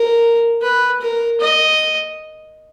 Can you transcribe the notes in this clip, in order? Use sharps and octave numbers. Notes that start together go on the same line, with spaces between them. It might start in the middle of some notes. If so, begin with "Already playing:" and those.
Already playing: A#4
B4
A#4
D#5